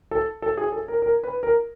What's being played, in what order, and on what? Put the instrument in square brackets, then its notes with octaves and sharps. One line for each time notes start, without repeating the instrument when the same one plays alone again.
[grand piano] A4
A4
G#4
A4
A#4
A#4
B4
A#4